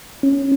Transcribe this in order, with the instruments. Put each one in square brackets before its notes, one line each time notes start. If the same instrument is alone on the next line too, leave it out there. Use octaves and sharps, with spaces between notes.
[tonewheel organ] C#4